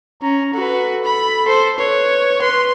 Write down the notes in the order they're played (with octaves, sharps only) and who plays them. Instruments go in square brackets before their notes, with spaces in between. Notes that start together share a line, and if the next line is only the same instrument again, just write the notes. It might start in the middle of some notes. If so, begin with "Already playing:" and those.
[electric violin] C#4 [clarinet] A#5
[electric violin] F#4 B4 [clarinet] A4
[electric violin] B5
[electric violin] A4 C5 [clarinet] C6
[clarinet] B4 [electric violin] C#5
[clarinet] B4 [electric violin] C6